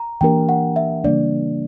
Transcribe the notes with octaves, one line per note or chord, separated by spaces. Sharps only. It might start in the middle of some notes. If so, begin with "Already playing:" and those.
Already playing: A#5
E3 A#3 D4 G4 A#4 G5
F#5
E5
C#3 E3 G3 A#3 D4 D5